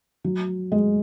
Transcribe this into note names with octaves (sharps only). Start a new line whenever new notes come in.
F#3
G#3